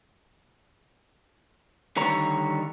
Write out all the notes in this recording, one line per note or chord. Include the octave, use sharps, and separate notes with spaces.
D3 D#3 G3 C#5 A#5